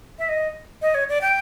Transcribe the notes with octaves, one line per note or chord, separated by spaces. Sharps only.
E5
D#5
D#5
C#5
D5
G5